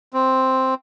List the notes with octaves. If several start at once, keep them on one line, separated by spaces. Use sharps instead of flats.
C4